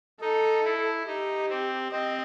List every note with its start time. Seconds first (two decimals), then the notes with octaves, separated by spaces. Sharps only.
0.21 D#4 A4
0.64 E4
1.07 D#4 G4
1.49 C4
1.91 C4 D#5